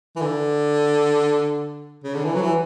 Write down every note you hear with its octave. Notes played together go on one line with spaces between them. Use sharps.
E3
D3
C#3
D3
E3
F#3
E3